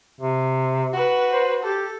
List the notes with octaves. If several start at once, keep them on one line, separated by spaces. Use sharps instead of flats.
C3
F#4 B4
C5
G4 A4